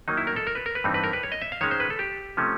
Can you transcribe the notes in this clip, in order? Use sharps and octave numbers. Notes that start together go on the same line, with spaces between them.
D#3 F#3 A#3 D#4
E4
A#4
A4
A#4
B4
A#4
B4
G2 E3 G3 C4 D#4
B4
A#4
B4
C#5
D#5
E5
F5
D#3 G#3 C#4 C#5
C5
B4
A4
G4
C3 F3 A3 C#4